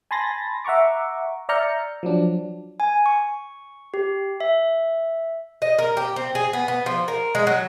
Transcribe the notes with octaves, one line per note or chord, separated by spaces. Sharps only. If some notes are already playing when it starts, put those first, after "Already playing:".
G#5 A5 B5 C6 A6 A#6
E5 F#5 A#5 C#6 D6
D5 E5 A#5 F6 G6 C#7
F3 F#3 D4
G#5
C#6
G4
E5
D#5
A#4
G4
C4
G#4
B3
B3
F3
A#4
G#3
F#3